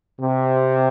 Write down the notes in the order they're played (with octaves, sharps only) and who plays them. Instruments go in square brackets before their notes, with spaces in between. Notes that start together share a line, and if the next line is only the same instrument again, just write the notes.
[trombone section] C3